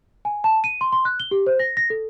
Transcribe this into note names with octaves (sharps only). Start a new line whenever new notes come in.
G#5
A5
D#7
C6
C6
F#6
G7
G4
C5
A#6
A#6
A4